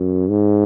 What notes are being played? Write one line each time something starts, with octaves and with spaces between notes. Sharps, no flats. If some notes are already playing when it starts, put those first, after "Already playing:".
Already playing: F#2
G#2